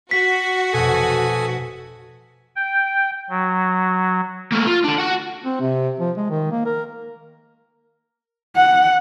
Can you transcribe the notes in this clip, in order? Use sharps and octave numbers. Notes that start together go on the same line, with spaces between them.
F#4 B6
F1 B2 A4 G#5 D#6
G5
F#3
A3 A#3
F4
D4 A4
F#4 F#5
C4
C3
F3
G#3
D#3
A#3
A#4
F#5